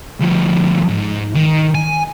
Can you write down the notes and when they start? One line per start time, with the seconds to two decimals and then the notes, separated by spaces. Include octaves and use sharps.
0.21 D2 F3
0.88 G#2
1.35 D#3
1.75 G#5